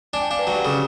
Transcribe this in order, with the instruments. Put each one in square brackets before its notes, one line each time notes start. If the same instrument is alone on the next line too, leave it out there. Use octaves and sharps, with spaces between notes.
[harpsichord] D4 [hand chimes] G#5
[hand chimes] G5
[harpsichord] D4 [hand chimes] F5
[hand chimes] B4
[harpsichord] F#3
[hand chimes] G4
[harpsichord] C#3 [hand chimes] A4